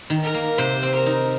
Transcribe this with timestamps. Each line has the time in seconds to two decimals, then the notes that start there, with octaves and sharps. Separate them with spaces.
0.10 D#3
0.22 A#4
0.34 A#3
0.58 C3 C5
0.83 C4
0.94 A#4
1.06 D#4